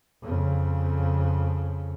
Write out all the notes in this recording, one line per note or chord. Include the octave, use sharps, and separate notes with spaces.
F2 C#3